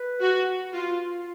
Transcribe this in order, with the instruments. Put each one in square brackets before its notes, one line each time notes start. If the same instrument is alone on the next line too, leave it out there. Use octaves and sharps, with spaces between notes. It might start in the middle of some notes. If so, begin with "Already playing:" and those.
Already playing: [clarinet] B4
[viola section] F#4
F4